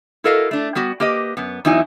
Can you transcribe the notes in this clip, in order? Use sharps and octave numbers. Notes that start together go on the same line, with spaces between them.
E4 F#4 A4 A#4 D#5 F5
A3 D4
G3 B3 F#4
A#3 G4 B4 D#5
F#2 B3
E2 F#3 D#4 E4 G#5